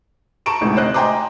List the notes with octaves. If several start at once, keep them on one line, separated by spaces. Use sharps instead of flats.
A5 A#5 C#6 D7 E7
A1 D2 G#2 C3
C5 D#5 F#6
D#5 G5 G#5 A#5 C6 D6